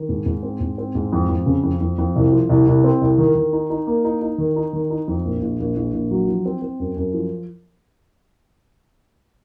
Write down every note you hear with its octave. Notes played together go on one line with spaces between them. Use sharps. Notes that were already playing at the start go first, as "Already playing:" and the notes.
Already playing: D#3
G#2
G#2
C4
G#2
C4
G#2
F2
F2
C#3
F2
F2
F2
C2
F3
C2
C2
C4
C2
D#3
D#3
D#4
D#4
A#3
D#4
D#4
D#3
D#4
D#3
D#4
F2
A#1
A#1
A#1
A#1
A#1
F#3
F3
C4
C4
F#2
F#2
F3